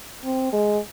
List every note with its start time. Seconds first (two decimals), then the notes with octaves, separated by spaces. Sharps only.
0.24 C4
0.52 G#3